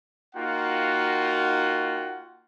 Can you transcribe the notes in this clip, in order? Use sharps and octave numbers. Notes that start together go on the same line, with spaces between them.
A#3 D#4 F4 F#4 F#5 G5